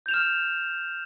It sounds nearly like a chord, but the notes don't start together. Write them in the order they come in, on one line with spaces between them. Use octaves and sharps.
G6 F7 E7 F6